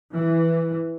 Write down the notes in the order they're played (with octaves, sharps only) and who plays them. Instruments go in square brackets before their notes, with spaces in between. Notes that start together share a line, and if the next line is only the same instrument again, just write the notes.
[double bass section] E3